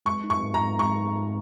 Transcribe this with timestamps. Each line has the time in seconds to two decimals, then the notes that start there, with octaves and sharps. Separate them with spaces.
0.06 G#3 C#6
0.24 D#4
0.30 C#6
0.43 G#2
0.54 A#5
0.61 G#2
0.79 G#3 C#6
0.98 D#4
1.16 G#2